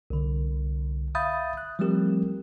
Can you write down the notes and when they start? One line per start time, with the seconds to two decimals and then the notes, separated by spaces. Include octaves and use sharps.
0.10 C2 D3
1.15 E5 F5 B5 D#6 G6 A6
1.57 F#6
1.79 F3 G3 A3 C4 G4 A#4